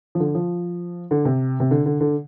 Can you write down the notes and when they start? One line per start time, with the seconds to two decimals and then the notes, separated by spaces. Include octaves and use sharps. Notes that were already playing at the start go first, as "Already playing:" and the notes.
0.15 F3
0.20 D3
0.35 F3
1.11 D3
1.25 C3
1.60 C3
1.71 D3
1.86 D3
2.01 D3